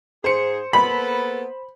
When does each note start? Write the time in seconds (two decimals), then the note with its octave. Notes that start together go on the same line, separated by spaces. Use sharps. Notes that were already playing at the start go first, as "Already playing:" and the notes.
0.24 G#2 G#4 C5 C#7
0.73 A#3 B3 A4 B5